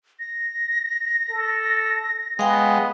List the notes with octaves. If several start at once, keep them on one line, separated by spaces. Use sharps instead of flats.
A#6
A4
G#3 B3 F5 G5